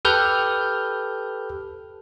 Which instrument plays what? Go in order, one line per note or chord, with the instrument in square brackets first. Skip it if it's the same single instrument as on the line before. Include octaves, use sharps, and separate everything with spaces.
[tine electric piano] G4 A4 B4 F6 G6